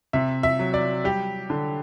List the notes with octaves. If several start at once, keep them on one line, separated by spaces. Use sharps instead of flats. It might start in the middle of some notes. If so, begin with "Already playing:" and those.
C3 E5
E5
F#3
D5
G3 G4
D3